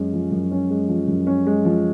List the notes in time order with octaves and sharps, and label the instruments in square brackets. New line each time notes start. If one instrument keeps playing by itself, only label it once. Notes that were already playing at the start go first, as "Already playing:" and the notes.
Already playing: [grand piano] F#2 G#3 C#4
F3
F#2
C#4
G#3
F3
F#2
C#4
G#3
F3